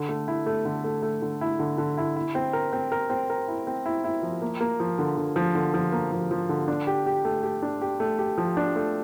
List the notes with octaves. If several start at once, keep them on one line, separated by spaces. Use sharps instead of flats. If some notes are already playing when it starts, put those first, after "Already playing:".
Already playing: D3
A3
E4
A3
D3
A3
A3
D3
E4
D3
D3
E4
E4
C4
A#4
C4
A#4
C4
A#4
E4
C4
E4
E4
F3
A#3
A#3
F3
D3
D3
F3
D3
F3
A#3
F3
F3
D3
D4
G4
G4
A3
G4
D4
G4
A3
G4
F3
D4
A3